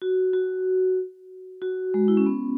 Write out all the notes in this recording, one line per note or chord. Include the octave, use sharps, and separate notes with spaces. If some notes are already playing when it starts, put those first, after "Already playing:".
F#4
F#4
F#4
G#3
E4
C#4
B3